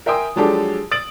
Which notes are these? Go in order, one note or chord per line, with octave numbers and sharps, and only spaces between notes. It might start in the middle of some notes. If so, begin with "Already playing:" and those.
A#4 E5 G5 G#5 C6 D#6
F3 F#3 G#3 D4 G4 A4
D#6 A6 D7 F#7